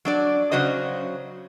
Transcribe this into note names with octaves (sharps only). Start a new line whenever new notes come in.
F#3 D4 D5
C#3 F#3 F#4 C5 D#5